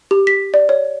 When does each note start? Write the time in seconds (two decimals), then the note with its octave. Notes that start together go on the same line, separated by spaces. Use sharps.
0.11 G4
0.27 B6
0.54 D5
0.69 C#5